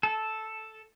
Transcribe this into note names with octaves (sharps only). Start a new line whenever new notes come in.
A4